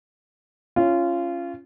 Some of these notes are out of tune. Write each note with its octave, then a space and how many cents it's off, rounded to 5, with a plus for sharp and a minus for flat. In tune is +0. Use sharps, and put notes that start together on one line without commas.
C#4 +0 F4 -20